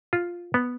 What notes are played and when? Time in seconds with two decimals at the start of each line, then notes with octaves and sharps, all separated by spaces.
0.13 F4
0.54 B3